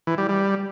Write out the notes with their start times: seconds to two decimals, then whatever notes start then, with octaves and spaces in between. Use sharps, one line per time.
0.07 E3
0.18 G3
0.29 G3